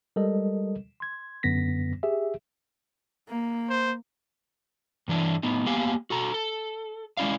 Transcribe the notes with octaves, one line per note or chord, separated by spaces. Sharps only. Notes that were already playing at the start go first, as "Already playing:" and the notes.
G3 G#3 A4 A#4 D#5
C6 G#6
F#2 D3 B3 A#6 B6
G4 G#4 E5
A#3
C5
G2 E3 D4 E4
A2 B3 D#4
A#3 B3 G4 F5 G#5
F#4 A4 A#5
A4
G#3 C#4 E4 D5 F5